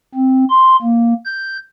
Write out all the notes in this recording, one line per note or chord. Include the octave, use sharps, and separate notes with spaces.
C4
C6
A#3
G6